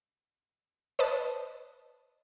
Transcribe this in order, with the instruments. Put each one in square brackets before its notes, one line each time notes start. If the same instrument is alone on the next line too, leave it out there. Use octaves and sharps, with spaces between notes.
[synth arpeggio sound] B4 C5 D#5 A5 B5